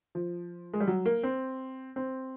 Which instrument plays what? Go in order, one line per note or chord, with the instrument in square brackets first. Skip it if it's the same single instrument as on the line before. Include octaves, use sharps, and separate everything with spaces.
[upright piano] F3
G#3
G3
F#3
A#3
C4
C4